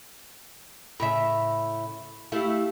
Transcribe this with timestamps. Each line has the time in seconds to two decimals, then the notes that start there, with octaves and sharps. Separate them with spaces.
1.00 A2 C#3 E5 B5
2.32 A3 E4 G4 F5